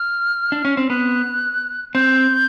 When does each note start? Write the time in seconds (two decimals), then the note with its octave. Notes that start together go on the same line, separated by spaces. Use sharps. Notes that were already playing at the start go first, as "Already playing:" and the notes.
Already playing: F6
0.52 D4
0.65 C#4
0.77 C4
0.90 B3 F#6
1.95 C4 G6